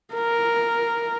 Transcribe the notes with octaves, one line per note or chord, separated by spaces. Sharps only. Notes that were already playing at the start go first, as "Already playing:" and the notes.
A#4